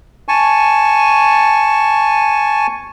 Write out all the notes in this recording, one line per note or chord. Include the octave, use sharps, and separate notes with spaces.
G#5 A5 C#6